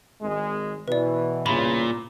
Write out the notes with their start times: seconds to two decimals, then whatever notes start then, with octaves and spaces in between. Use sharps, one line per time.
0.22 G#1 G#3
0.88 B2 E3 B4 D5
1.46 E2 G2 A#2 C#3 B5